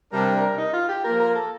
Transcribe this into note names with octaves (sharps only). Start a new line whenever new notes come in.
C3 G3 D4 A#4
A#4
D#4
F4
G4
F3 A#3 F4 A#4
A#4
A4